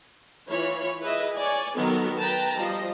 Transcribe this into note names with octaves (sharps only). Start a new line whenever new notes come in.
E3 F4 C#5 B5
E4 G#4 B4 D#5 E5
C#5 D5 G#5
D#3 F#3 B3 A4 A#4
B4 G5 A5 A#5
F3 G3 D#5